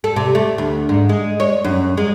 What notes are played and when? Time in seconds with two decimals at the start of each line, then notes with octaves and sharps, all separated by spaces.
0.04 A4
0.16 C3
0.35 A3
0.58 D2
0.89 G#2
1.09 G#3
1.40 C#5
1.64 F#2
1.97 G#3